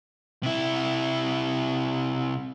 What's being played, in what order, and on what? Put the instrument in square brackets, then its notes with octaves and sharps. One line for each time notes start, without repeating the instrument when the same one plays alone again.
[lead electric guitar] C3 E4